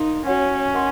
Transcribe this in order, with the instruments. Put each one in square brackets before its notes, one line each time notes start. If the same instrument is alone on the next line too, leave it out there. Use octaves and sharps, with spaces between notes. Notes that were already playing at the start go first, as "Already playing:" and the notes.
Already playing: [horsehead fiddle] D#4 [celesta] A#4 F5 C6
[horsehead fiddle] C#4 [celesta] F#4 C#5 F#5
[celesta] A#4 D#5 F#5 C6